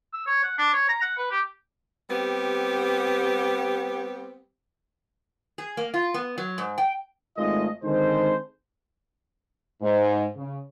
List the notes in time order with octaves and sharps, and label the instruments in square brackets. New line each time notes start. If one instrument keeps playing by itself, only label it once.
[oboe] E6
C#5
F#5
D4
C#5
A#5
F#5
B4
G4
[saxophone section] G3 B3 C4 G4
[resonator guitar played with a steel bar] G#4
A#3
F4
B3
F#3
G#2
G5
[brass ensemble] G#1 D#3 G#3 A3 F4 D#5
D3 D#3 G#3 C4 A4 C5
[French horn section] G#2
C#3